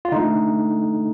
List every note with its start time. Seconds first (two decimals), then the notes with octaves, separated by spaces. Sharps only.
0.05 F4
0.12 D3 A3 D#4